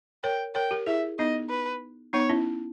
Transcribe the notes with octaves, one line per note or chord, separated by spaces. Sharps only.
A#4 C#5 G5
A#4 C#5 G5
G4 A#4
E4 G#4 E5
B3 D#4 D#5
B4
B3 D#4 C#5
C#4 E4